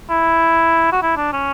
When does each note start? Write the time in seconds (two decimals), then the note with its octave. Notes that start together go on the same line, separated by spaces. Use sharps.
0.10 E4
0.93 F#4
1.03 E4
1.17 D4
1.33 C#4